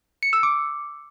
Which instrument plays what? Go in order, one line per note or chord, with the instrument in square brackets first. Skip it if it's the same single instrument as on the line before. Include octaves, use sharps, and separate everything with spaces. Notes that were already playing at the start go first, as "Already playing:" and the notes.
[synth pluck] C#7
E6
D6